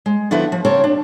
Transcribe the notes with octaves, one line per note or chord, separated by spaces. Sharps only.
G#3
D3 F3 B3 E4 F#4 B4
F3
C#3 C4 A#4 C#5 A5
D4